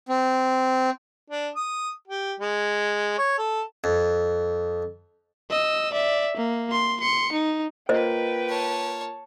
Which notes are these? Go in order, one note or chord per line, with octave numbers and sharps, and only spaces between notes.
C4
D4
D#6
G4
G#3
C#5
A4
F2
D#5 E6
D5 E5
A#3
C6
C6 C#7
D#4
A#3 F4 B4 C5 D#5 G5
C#5 A5